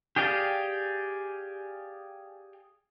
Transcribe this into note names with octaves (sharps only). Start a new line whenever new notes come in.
G4 G#4 D5 F5